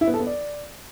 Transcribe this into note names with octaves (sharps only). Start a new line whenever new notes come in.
E4
B3
A4
B3
D5